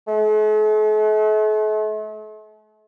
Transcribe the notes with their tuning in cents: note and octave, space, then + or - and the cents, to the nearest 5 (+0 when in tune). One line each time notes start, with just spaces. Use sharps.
A3 -45